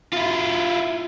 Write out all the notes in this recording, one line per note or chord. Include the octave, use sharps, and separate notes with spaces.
E4 F4